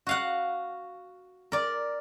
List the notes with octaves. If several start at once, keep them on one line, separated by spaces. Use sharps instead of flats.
F#4 F5 F#5
A#4 D5